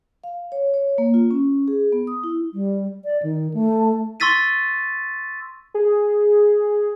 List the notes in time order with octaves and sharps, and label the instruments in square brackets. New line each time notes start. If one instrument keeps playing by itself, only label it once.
[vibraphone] F5
C#5
C#5
A#3
F4
C#4
G#4
B3
D#6
E4
[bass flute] G3
D5
D#3
A3
[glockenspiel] C6 C#6 E6 A6 B6 D#7
[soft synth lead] G#4